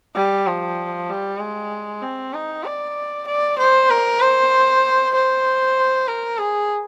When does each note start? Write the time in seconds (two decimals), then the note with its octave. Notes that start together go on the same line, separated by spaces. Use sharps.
0.16 G3
0.47 F3
1.09 G3
1.40 G#3
2.02 C4
2.34 D#4
2.65 D5
3.27 D5
3.58 C5
3.90 A#4
4.21 C5
5.14 C5
6.08 A#4
6.38 G#4